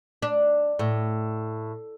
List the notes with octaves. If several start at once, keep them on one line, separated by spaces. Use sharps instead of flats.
D4
A2